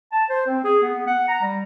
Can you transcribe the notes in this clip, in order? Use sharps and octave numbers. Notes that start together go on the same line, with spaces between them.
A5
C5
C4
G#4
B3
F#5
A#5
G3